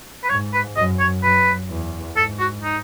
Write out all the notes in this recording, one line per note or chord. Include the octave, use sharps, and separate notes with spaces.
B4
G#2 C#5
B4
F#2 D#5
C#5
F#2 B4
E2
G#2 A4
F#4
D#4